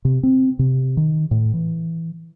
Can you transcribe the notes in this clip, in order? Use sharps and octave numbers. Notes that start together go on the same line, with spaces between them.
C3
C4
C3
D#3
A2
E3